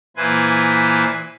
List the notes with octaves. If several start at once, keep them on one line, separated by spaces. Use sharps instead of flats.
A#2 E3 B4 C5 G#5